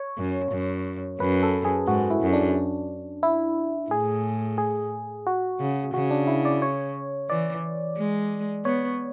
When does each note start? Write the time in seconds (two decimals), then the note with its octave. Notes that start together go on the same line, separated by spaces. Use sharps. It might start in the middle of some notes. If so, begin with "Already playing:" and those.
Already playing: C#5
0.18 F#2
0.52 F#2
1.20 F#2 B4
1.43 A4
1.65 G#4
1.87 G#2 F#4
2.10 E4
2.22 F#2
2.33 D4
3.23 E4
3.90 A2 G#4
4.58 G#4
5.27 F#4
5.60 C#3
5.94 C#3 F#4
6.11 D4
6.27 E4
6.45 D5
6.62 C#5
7.30 E3 D5
7.97 G#3
8.65 B3 C#5